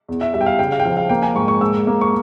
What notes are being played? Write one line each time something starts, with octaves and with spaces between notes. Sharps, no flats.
E2
E5
G3 E5
G5
F5
C#3 G5
F5
G5
F3 F5
F5
A#3 G5
G#5
G#2 C#6
C#6
G#2 E6
A#3
C#6